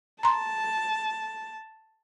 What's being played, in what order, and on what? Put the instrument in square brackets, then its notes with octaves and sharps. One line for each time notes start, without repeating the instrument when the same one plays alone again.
[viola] A5 [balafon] A#5 C6